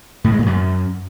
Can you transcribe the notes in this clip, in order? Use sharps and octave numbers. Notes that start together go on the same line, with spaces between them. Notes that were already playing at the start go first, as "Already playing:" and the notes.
A2
G#3
A#2
F#2